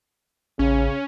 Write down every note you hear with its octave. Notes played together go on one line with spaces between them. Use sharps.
A1 C#3 C#4